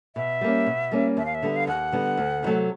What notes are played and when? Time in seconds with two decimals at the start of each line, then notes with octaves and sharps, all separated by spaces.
0.16 B2 E5
0.41 G3 A#3 C#4
0.66 B2
0.91 G3 A#3 C#4
1.17 D#2 E5
1.25 F5
1.35 E5
1.42 D3 G3 B3
1.56 F5
1.67 D#2 F#5
1.92 D3 G3 B3
2.17 D2
2.43 C3 D#3 F#3 A3